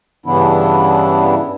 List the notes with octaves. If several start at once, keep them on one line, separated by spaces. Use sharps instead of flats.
G2 C#3 E3 B3 D4 E4